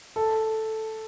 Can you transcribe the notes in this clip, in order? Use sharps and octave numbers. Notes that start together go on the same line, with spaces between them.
A4